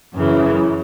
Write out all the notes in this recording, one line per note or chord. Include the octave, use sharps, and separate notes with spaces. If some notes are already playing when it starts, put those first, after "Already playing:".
F#2 C#3 E3